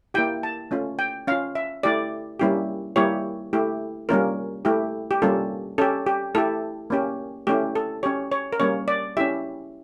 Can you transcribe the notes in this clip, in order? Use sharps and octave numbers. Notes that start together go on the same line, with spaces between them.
A#3 E4 G4 G5
A5
A3 C#4 F4
G5
C#4 F4 F5
E5
A3 E4 G4 D5
G3 A#3 C#4 E4 G4
G3 A#3 E4 G4 C#5
A3 E4 G4
G3 A#3 C#4 F4 A#4
A3 E4 G4
G4
G3 A#3 C#4 F4 A4
C#4 G4 A4
G4
A3 E4 G4 A4
A#3 C#4 G4
A3 C#4 E4 G4
A4
C#4 G4 C#5
C#5
A#4
G3 A#3 C#4 C#5
D5
C#4 E4 G4 E5